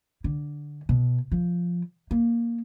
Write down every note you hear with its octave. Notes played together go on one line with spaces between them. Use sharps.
D3
B2
F3
A#3